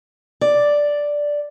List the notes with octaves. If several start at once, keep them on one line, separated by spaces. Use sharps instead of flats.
D5